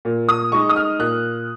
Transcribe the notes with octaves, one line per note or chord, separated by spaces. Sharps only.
A#2
D#6
G#3 D#4 C#6
D#6
F6
A#2 F#6